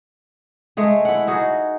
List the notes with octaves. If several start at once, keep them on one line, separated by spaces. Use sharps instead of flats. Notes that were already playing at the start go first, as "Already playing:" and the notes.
G#3 A3 G#4
E4 F#5
D#4 F#4 G#4